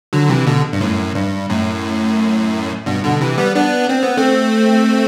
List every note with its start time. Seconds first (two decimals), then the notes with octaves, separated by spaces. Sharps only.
0.13 D3 F#3
0.29 C3 E3
0.46 B2 D3
0.73 G2
0.81 F#2 A2
1.15 G2
1.49 F#2 A2
2.86 G2 B2
3.03 B2 D3
3.21 C3 E3
3.38 G3 B3
3.55 B3 D4
3.89 C4
4.03 B3
4.17 A3 C4